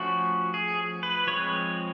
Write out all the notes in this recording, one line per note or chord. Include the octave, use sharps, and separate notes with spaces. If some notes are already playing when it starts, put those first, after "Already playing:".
Already playing: F3 A3 C#4 F#4
G#4
B4
F3 G#3 C4 C#5